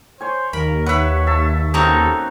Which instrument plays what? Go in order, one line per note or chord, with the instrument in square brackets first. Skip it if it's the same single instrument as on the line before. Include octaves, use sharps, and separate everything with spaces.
[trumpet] C5 [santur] C#5 G#5
[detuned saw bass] D#2 [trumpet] A#4 [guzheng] B5
[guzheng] B4 B5 [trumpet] C#5 [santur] E5 F#5
[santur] E5 A5 C#6
[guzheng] A#3 C4 C#4 [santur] D#4 F#4 [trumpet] A4